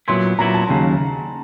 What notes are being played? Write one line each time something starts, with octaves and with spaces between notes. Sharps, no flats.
A#2 F#3 B3 E4 C6
A#2 F#3 B3 E4 A#5
A5
D#2 C#3 F#3